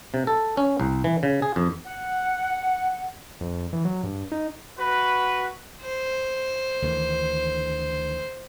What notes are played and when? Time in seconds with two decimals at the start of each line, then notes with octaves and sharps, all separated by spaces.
0.14 C3
0.27 A4
0.57 C#4
0.80 C2
1.04 E3
1.23 C#3
1.42 G#4
1.56 F2
1.86 F#5
3.41 F2
3.73 E3
3.85 F#3
4.04 G2
4.32 D#4
4.78 F#4 B4
5.82 C5
6.82 D2 D#3 E3